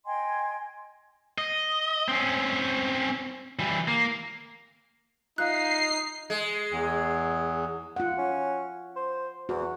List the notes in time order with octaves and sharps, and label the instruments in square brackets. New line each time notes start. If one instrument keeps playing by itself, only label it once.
[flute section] D#5 G5 G#5 C6
[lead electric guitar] D#5
C4 C#4
E3 G3
A#3
[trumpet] D#4 [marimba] F4 E5 F5 [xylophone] F#6 [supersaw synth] C7
[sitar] G#3
[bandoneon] E2
[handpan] F4 F#5
[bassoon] C#4
C5
[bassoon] E2 [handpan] F#4